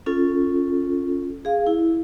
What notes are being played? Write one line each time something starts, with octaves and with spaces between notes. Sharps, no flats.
C#4 F4 A4
G#4 F5
E4